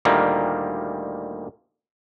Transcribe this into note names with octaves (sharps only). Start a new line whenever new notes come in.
D2 A#2 D#3 G3 A#3